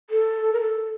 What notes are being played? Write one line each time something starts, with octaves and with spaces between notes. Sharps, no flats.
A4
A#4
A4